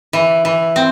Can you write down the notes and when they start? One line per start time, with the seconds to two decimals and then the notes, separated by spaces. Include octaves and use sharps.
0.13 E3
0.45 E3
0.76 C4